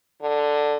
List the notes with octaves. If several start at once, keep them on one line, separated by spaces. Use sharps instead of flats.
D3